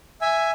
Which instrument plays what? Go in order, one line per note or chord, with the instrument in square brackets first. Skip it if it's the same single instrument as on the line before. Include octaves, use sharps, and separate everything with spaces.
[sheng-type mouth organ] E5 G#5